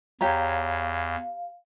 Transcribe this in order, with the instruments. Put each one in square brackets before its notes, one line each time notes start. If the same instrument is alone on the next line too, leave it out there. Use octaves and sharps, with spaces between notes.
[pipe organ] E2 [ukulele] G4 C#5 A#5 [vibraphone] F5